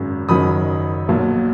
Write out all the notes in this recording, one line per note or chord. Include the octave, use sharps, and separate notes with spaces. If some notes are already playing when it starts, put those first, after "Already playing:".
Already playing: G#1 F#2 C#3 F#3
F#1 F#2 D#3 F#3 B5 D#6
B1 A#2 F#3